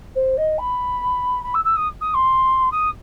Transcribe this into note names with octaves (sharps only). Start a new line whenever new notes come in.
C5
D#5
B5
B5
E6
E6
D#6
D#6
C6
D#6